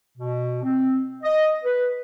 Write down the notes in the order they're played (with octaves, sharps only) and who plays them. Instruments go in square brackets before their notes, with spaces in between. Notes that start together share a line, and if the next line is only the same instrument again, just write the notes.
[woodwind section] B2
C4
D#5
B4